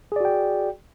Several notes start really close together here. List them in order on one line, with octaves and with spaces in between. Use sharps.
G#4 D5 F#4 G5